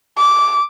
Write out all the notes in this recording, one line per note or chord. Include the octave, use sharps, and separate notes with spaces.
D6